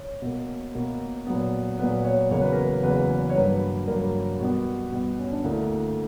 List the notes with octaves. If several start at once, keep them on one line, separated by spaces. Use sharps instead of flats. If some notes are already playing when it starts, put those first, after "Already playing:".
Already playing: C#5
B2 A#3
B2 A#3
A#2 F#3 B3
A#2 F#3 B3 B4
C#5
E2 C#3 F#3 A#3 C#5
B4
A#4
B4
E2 C#3 F#3 A#3 B4
C#5
G2 F#3 A#3 B4
G2 F#3 A#3 A#4
B2 G3 B3 F#4
B2 G3 B3
C#4
D4
D2 D3 A#3 E4